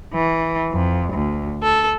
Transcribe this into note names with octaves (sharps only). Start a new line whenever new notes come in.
E3
F2
D2
A4